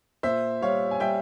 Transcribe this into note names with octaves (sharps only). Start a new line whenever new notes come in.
A#2 C5 E5
G3 C#5 F5
G#5
G3 E5 G5